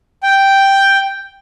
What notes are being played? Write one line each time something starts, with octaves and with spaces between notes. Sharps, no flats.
G5